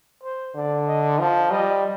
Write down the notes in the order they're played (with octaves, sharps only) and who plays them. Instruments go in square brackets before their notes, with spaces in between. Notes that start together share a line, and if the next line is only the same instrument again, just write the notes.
[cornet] C5
[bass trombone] D3 [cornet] D5
[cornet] D#5
[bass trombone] F3 [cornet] D#5
[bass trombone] G3 [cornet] D#5